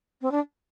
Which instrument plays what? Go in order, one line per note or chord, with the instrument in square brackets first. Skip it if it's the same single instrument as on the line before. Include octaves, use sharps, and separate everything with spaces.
[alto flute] C4
D4